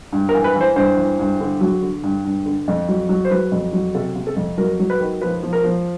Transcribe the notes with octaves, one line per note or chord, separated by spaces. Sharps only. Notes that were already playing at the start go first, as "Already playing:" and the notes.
G2
A#4
E3
B4
E3
C5
G2 C5
E3
G2
D3
F#3
D3
G2
G2
D3
F2
F#3
F#3
C5
F#3 B4
F2
F#3
C3 A4
C3
A4
F2
F#3 A#4
F#3
B4
D#3
F3 B4
F3
A#4
F3